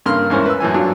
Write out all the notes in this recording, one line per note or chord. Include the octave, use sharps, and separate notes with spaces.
G2 C#3 A#3 C6 F6
E2 G#2 C#4 E4 A#4 C5
B4 E6
F#2 A2 E3 G#5
G2 F#3 B3 D4 F4